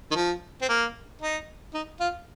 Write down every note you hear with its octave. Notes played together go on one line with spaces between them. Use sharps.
D#3
F3
C4
A#3
D#4
D#4
F4